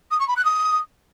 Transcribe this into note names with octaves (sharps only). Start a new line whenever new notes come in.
D#6
C#6
B5
F#6
D#6